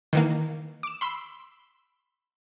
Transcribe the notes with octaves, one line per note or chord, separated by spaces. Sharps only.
D#3 E3 A#3
D6 E7
B5 C6 E6